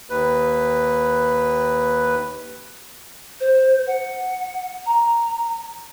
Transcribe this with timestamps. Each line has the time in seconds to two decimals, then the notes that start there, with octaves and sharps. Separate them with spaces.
0.10 D#2 B4
3.40 C5
3.87 F#5
4.86 A#5